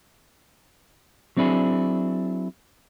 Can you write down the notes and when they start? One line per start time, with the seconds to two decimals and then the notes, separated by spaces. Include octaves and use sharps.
1.37 F#3 C4 D4 E4 G#4